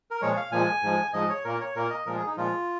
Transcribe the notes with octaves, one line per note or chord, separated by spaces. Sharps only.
A#4
A#2 F3 G#3 C#5
F5
A#2 F3 G#3 G#5
G#2 F3 G#3
G#2 F3 G#3 D#5
C#5
A#2 A#3 A#4
C#5
A#2 A#3 A#4
D#5
A#2 F3 G#3 A#4
G#4
D#4
A#2 F3 G#3 F4